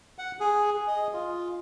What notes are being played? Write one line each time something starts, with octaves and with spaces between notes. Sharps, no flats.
F#5
G#4
D#5
F4